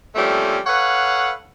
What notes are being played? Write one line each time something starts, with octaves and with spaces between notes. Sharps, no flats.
F3 G3 A3 A#3 C4 C#4
A4 B4 C#5 F5 F#5